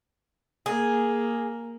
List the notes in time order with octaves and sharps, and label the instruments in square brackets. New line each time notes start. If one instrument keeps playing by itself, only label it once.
[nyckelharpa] A#3 [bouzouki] G#4